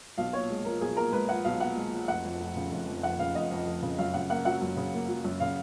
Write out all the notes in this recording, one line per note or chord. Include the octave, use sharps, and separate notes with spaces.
B1 F5
A#2 C#5
G#3
F3 A#4
B1 G#4
A#2 A#4
G#3 B4
F3 F#5
B1 F5
A#2 F#5
G#3
F3
F1 F#5
F2
F1
C#3
F1
F2
F1 F#5
C#3 F5
F1 D#5
F2
F1
C#3
F#2 F5
C#3 F#5
A#3 F#5
F#3 F#5
F#2
C#3
A#3
F#3
F#2
C#3 F5